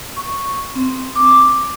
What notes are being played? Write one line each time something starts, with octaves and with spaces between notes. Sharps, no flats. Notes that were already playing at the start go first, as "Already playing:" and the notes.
C#6
C4
D6